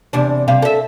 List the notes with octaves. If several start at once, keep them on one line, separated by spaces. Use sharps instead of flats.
E2 C3 D4
C3 G3 F5
A4 E5